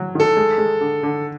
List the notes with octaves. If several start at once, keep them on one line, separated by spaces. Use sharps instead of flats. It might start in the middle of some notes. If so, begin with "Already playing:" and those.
Already playing: F#3
D#3 A4
G#3
G#3
D3
D3